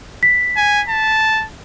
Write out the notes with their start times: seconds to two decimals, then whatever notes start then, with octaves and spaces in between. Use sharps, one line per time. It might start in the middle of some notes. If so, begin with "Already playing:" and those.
0.23 B6
0.57 G#5
0.89 A5